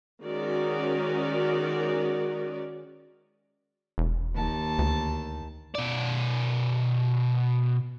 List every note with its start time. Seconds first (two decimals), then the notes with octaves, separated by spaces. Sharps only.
0.24 D#3 G#3 C#4 F#4 A#4 D5
3.98 E1
4.35 D#2 A5
4.79 D2
5.75 B2 D5